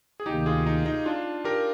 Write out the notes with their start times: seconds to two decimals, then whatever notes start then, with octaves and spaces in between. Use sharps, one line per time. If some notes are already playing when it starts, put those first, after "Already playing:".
0.20 G#4
0.26 D2 C3 D#3 A#3 D#4 G4
0.46 F4 G#4
0.66 D#4
0.86 D#4
1.06 D4 F4
1.45 G4 A#4